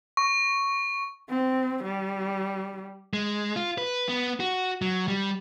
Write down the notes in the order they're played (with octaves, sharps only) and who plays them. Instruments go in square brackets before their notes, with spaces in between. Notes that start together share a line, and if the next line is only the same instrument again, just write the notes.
[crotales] C#6
[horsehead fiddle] C4
G3
[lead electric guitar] G#3
F4
B4
B3
F#4
F#3
G3